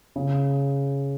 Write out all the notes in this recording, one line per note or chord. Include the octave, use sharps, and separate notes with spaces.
C#3